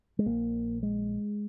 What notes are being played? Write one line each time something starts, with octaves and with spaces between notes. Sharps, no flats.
G#3
A#1 A#2 A#3
G#3